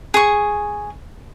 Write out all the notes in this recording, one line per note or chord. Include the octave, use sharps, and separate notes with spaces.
G#4 C#6